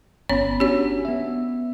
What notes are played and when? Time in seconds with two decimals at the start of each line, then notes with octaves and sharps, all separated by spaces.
0.29 G1 B3 C#4 C#5 B5
0.60 C#4 D4 F#4 G4 C#5
1.05 B3 E5